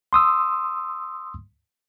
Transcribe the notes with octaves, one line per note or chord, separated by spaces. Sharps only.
C6 D#6 E6